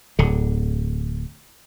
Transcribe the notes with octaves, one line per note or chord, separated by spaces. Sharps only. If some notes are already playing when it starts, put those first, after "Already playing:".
D1 D3